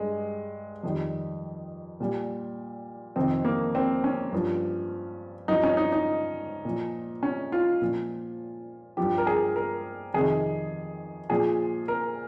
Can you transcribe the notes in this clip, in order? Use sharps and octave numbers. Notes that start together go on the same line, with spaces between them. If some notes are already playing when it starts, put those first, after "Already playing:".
Already playing: G2 G3 G#3
F2 D#3 G3
A#2 G3
F2 C3 D#3 C4
A#3
C4
C#4
G2 F3
G2 F3 D#4
C#4
D#4
D#4
A#2 F3
C#4
F4
A#2 F3
G2 F3 G4
A#4
G#4
A#4
F2 C3 D#3 G#4
A#2 F3 G#4
A#4